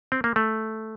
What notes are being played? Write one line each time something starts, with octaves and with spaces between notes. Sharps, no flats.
C4
A#3
A3